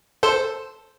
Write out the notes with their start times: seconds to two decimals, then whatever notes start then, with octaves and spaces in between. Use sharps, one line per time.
0.23 A4 C5